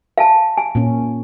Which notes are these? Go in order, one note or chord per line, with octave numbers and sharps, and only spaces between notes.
F5 G#5 A5
G#5
A#2 C#4